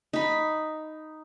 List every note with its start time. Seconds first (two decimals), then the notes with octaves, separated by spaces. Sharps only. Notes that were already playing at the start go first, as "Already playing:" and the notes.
0.13 D#4 B5